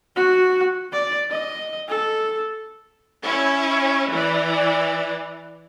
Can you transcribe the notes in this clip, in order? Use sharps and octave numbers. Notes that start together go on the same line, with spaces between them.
F#4
D5
D#5
A4
C#4 E4
E3 D5